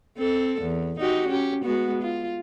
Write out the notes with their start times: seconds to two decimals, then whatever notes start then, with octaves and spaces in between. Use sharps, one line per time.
0.18 C4 A4
0.62 E2
0.99 D#4 F#4 G4
1.28 C#4 G4
1.64 G#3 B3 F#4
2.02 F4